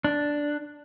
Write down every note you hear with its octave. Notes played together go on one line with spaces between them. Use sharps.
D4